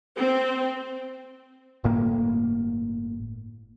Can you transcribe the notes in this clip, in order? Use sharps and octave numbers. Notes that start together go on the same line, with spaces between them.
C4
G1 A2 A#3